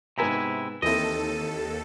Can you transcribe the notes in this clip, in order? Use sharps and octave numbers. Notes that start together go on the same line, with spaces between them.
G#2 C3 B3 E4 G#5 A#5
D#2 E3 C4 E4 A4 D#5